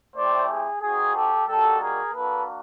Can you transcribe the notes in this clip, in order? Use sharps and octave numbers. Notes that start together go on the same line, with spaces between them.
A3 C4 E4 G4 C5 D5
G#4
C4 D#4 F#4 G#4
G4 A4
G3 A#3 D#4 F#4 G4 A4
G#4 A#4
A#3 D4 F#4 A4 B4